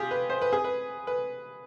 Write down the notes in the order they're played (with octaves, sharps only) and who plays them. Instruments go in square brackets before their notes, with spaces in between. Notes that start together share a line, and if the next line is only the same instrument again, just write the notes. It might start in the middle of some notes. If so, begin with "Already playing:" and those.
Already playing: [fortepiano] F4 G4 G#4
B4
C5
B4
G#4
B4
B4